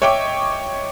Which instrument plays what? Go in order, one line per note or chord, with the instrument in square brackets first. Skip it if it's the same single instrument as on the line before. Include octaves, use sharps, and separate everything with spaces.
[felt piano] C#5 D#5 E5 G5 C#6 D6